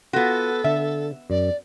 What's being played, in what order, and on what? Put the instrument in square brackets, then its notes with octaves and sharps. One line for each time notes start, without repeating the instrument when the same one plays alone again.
[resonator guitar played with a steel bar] B3 F#4 [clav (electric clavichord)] F4 [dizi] A4
[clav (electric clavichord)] D3 [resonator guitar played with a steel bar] E5
[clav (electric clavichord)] F#2 [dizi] D5